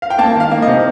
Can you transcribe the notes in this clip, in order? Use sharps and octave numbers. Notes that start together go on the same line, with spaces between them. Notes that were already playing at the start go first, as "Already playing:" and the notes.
F5
G5
A#3 A5
D#3
F5
A#3
C3 D#5